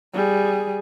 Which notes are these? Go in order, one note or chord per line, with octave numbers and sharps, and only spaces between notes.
G3 G#4